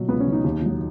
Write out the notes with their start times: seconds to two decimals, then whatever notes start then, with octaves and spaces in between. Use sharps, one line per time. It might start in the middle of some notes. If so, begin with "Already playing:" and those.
Already playing: B2 F#3
0.09 C#2 B3
0.20 C#4
0.26 B2 F#3
0.33 D#4
0.44 D#2
0.62 D#3 F#3